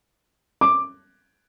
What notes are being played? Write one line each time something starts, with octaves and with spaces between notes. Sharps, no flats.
D6